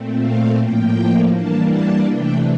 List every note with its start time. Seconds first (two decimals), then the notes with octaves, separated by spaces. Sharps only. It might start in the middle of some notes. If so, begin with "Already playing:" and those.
Already playing: A#2 A3 C4
0.21 F5
0.58 A2 F3 A#3 G5
1.33 E3 G3 A#3 D4 A5
1.71 A5
2.09 C3 E3 A3 D4 G5